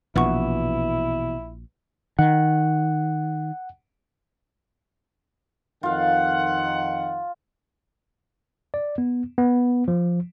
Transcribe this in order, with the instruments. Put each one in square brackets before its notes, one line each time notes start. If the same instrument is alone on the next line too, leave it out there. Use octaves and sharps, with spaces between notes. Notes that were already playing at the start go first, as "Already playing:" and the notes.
[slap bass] A#1 [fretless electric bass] B2 E3 [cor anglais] E4 [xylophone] B4 F#5 C#6
[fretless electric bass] D#3 [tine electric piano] F#5
[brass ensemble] F2 D#3 F#5 [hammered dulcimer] F4 F5
[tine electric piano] D5
B3
B3
F3